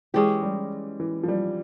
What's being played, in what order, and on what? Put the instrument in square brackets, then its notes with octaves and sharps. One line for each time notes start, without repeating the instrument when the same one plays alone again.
[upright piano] E3 [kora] G#3 C#4 G4
[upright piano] G3
E3
F3
G3